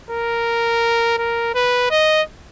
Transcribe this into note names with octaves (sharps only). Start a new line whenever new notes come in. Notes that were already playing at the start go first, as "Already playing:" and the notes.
A#4
A#4
B4
D#5